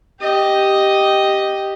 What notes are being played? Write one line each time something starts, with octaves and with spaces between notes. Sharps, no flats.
G4 D#5